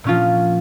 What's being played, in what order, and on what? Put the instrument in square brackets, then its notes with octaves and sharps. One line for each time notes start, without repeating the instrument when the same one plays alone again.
[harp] A#2 F3 C#4 F4